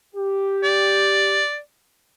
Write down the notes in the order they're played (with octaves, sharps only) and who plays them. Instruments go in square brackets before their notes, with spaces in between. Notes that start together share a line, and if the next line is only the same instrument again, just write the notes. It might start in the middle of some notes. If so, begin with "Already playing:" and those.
[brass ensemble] G4
[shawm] D5